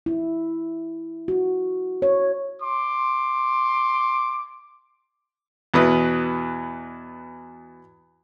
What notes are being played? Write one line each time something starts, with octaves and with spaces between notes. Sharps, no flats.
E4
F#4
C#5
C6 D6
E2 B2 E4 B4 D#6